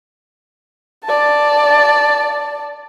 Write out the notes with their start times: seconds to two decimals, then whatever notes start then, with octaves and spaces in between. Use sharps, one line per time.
1.05 D5 A5